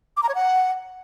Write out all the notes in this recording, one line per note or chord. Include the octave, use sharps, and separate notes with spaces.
D6
A#5
C#5
F#5